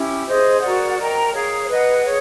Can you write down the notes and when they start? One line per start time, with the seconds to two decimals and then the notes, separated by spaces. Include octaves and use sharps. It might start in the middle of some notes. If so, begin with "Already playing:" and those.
Already playing: C#4 E4 G4
0.26 G#4 C5 D#5
0.61 F#4 A#4 D5 F#5
0.98 A#4 D#5 G5 A#5
1.32 G#4 C#5 F5
1.68 B4 D#5 F#5
2.03 G#4 C#5